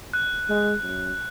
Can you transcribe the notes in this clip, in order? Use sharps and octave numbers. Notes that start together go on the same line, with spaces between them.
F#6
G#3
F#2